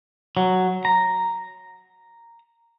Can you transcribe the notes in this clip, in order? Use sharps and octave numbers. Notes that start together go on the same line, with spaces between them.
F#3
A#5